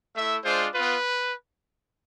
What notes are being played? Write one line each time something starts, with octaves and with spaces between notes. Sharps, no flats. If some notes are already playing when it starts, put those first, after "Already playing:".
A3 E4 E5
G#3 D4 F4 C5
B3 F4 B4